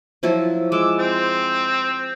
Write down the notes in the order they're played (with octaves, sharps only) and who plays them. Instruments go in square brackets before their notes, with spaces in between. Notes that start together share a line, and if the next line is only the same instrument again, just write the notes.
[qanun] F3 F#3 E4
[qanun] G#3 [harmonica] D6 E6
[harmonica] C4